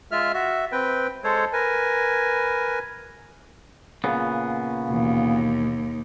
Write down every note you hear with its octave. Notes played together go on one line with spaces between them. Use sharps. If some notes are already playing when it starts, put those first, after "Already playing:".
G#3 F4 E5 F6
F#4 E5
C4 B4 G5
G#3 A4 C5 C#5
A#4 B4 G#5
A#2 C#3 B3
D#2 B2 E3